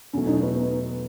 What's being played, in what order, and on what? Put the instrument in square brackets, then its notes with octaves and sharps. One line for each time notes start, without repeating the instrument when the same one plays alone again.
[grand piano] E2 B2 F#3 A3 [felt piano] C#4
[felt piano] D#4
B3
B3